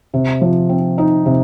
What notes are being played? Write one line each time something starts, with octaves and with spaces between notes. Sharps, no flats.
C3
F3
C4
D#4
C3